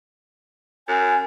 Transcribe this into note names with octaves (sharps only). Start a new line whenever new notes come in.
F#2 G#5